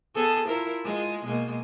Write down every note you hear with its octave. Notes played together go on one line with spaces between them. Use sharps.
B3 G#4 A4
E4 F4 A#4
G#3 F4
B2 G#3 A#3